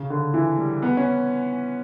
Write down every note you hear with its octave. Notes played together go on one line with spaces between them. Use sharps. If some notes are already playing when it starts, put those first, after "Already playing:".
Already playing: C#3
D3
E3
G3
B3
C#4